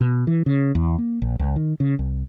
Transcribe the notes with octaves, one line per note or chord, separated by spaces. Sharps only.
B2
E3
C#3
E2
A#3
A#1
C#2
D#3
C#3
C2